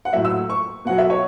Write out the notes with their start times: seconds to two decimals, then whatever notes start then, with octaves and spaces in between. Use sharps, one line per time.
0.05 F#5
0.13 A2 F#3 E5
0.25 E6
0.50 C#6
0.85 B2 F#3 F#5
0.98 E5
1.10 C#5